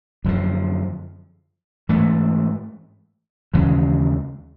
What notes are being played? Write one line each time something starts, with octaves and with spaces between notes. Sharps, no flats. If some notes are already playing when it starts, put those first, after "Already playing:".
F#2 D3 F3
G#2 E3 A3
D#2 C#3 E3 G#3